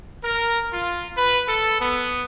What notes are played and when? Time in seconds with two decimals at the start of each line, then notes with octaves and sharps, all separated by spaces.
0.23 A#4
0.72 F4
1.17 B4
1.48 A4
1.80 B3